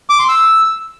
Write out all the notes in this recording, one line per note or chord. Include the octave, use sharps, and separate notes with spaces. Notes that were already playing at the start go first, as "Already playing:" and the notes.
D6
C6
E6